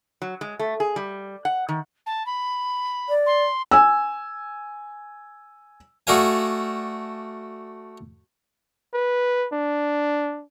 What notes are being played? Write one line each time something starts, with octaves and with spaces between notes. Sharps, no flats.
F#3
G#3
A3
G#4
G3
F#5
D#3
A5
B5
D5
C6
G#5 E6
A3 F#4 A4 D5 F5 G#5
B4
D4